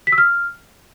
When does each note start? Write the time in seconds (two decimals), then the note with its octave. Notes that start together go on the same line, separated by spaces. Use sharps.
0.07 B6
0.12 E6
0.18 F6